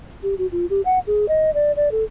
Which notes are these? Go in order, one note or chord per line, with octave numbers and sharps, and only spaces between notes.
G4
F#4
F4
G4
F#5
G#4
D#5
D5
D5
A4